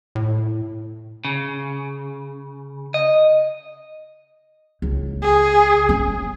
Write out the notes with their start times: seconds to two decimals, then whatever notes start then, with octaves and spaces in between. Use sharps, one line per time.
0.15 A2
1.25 C#3
2.94 D#5
4.82 C#2
5.22 G#4
5.89 C#4